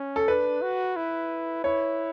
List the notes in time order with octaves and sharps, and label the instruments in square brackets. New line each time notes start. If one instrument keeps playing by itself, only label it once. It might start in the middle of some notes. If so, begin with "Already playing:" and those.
Already playing: [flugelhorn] C#4
[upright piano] A4
[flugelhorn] D4 [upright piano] B4
[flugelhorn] F#4
E4
[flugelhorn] E4 [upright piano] C#5